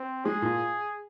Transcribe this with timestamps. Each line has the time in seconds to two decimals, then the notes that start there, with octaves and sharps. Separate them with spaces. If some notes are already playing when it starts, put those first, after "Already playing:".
Already playing: C4
0.25 G#3 G#4
0.42 A#2